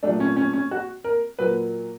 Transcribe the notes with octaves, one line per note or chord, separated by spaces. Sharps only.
A#2 F#3 A3 D4
C#4
C#4
C#4
F#4
A#4
A#2 F#3 A#3 B4